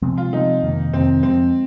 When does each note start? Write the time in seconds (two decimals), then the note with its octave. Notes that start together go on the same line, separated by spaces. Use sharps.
0.02 C3 F3 G#3 C4
0.18 F4
0.33 C3 F3 G#3 C4 D#4
0.63 F2 C3 D#3 A#3
0.93 F2 C3 D#3 A#3 C4
1.23 F2 F3 G#3 C4